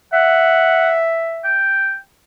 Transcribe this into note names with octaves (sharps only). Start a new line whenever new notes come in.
E5 F#5
G5